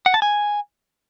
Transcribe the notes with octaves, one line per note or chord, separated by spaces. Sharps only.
F#5
A5
G#5